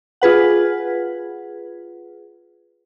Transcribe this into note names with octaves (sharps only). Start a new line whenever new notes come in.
F4 G#4 B4 F#5